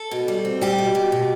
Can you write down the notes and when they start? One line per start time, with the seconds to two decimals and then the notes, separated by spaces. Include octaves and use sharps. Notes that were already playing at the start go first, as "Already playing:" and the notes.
Already playing: A4
0.11 B2
0.28 G3
0.45 C4
0.61 G3 G4
0.78 B2
0.95 B2
1.12 B2